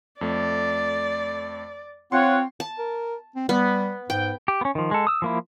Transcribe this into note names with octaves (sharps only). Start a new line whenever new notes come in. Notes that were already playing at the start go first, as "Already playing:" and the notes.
F2 A3 D5
C4 F4 C#5 F#5 C6
A5
A#4
C4
G3 B3
G#2 G5
G4
B3 C#4
D#3 F3
G#3 A4
D#6 E6
F3 A#3 E4